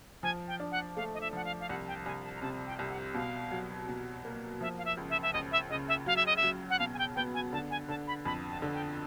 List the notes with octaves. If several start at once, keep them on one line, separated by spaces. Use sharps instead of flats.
F3 G#5
G5
D4
F#5
A3 F5
D#5
E5
F3 F#5
F5
F5
C2 F#5
G5
C2 G#5
A5
A#5
C3 A5
G5
C2
F#5
B2 F5
F#3
B2
A#3
F3 E5
F5
E5
C#2
E5
E5
C#2 D#5
E5
C#3 D#5
E5
F#3 F5
E5
D#5
E5
F#3
F#5
B2 F5
G#5
G5
B3 G5
G#5
D3 A5
G#5
D3 A5
B5
F2 B5
A5
D3
G5